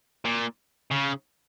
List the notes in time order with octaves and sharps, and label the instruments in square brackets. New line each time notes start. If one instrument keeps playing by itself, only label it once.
[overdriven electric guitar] A#2
C#3